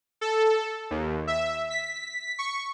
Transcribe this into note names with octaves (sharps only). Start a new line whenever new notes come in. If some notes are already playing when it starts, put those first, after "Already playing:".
A4
D#2
E5
B6
C#6